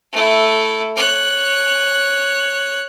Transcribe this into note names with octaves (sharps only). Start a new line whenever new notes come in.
A3 E4
C#5 F#6